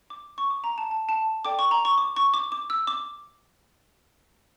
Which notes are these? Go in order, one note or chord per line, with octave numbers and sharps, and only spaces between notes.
D6
C#6
D6
A#5
A5
A5
A5
A4 D5 G5 D6
C#6
A#5
C#6
D6
C#6
D6
D6
E6
D6